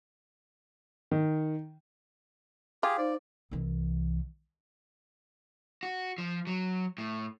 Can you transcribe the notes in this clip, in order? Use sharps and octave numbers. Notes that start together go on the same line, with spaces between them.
D#3
F4 G4 G#4
D#4 C5 D5
C2 E3
F#4
F3
F#3
A2